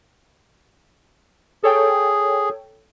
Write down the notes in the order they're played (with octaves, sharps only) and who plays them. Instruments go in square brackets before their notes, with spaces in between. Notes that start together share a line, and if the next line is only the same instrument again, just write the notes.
[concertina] G#4 [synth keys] A4 C#5 G5